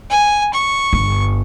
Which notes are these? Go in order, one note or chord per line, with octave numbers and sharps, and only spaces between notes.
G#5
C#6
G1